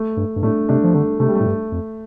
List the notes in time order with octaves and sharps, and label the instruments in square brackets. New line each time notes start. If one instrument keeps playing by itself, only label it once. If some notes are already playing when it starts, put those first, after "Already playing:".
Already playing: [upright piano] A3
[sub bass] G2
G2
[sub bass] A2 [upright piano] A3 D4
[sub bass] C3 [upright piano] A3 D4
[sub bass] F3
[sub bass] D3 [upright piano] A3
[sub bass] C3 [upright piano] A3
[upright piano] G3
A3
[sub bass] A2
G2
F2